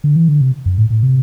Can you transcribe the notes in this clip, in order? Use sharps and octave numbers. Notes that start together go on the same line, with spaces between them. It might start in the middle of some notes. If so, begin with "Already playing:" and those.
D3
E3
D3
C3
F#2
A2
A2
C3